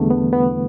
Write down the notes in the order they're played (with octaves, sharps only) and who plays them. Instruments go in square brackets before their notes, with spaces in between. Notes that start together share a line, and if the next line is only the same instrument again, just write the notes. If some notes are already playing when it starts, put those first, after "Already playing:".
Already playing: [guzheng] E2 D4 [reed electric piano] D3 E3 G3 A3
[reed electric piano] B3
B3